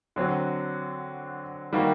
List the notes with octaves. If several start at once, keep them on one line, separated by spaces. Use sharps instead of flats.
D3 F#3 C4 F#4
D#3 G3 A#3 F#4